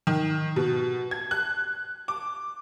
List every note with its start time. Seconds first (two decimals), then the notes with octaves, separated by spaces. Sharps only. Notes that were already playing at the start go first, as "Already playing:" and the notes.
0.07 D#3
0.56 B2
1.11 G#6
1.31 F#6
2.08 D6